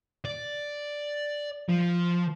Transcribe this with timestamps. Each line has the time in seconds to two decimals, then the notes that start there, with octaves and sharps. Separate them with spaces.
0.25 D5
1.69 F3